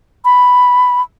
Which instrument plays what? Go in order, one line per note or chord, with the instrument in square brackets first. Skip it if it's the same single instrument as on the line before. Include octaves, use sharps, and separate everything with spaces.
[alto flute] B5